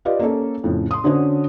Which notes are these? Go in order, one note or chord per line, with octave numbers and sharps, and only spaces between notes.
F4 G4 B4 D5 D#5 F5
A#3 C#4 A4
F2 A2 C#3
C6 D#6
D3 C#4 D4 F#4 C5 C#5